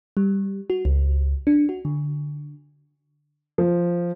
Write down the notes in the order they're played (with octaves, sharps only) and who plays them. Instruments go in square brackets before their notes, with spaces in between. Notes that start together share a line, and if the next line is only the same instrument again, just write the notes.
[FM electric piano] G3
F#4
C#2
D4
F#4
D3
[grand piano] F3